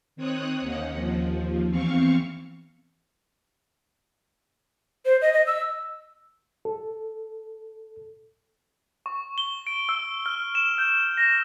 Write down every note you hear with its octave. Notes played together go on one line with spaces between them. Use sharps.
D#3 C4 C#5 D#6 F#6
D#2 A#3 C#4 D#4 F#5
D#2 F3
E2 E3 C4 F5 C#6
C5
D#5
D#5
E6
A4
C#6
G7
D7
E6
F6
E7
G6
A#6